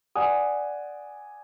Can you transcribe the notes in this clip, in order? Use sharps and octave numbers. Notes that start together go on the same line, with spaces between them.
D5 F#5 G#5 D#6